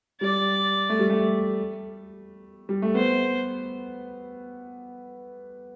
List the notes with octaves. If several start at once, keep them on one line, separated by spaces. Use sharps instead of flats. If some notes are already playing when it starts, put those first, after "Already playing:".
G3 D5
A3
G3
A3
G3
A3
B3 C5